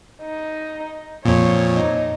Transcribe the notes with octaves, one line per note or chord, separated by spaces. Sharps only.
D#4
F2 A#2 C#5
D#4